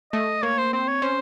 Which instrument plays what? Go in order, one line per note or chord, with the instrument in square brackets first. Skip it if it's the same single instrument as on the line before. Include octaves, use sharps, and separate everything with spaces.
[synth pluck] A3 [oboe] D#5
[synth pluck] A#3 [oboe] C#5
[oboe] C5
[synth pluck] C4 [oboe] C5
[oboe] C#5
[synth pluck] C#4 [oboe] C5